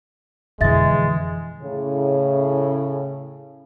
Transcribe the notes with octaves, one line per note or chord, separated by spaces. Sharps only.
F2 B2 D3 E3 G#3 E5 A6
A2 C#3